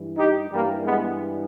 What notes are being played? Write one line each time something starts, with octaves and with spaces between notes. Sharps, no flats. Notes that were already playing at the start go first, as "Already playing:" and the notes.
Already playing: G2 E3
D#4 G4
G2 E3 G3 A#3
G#3 B3